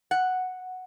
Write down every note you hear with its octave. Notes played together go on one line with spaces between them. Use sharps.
F#5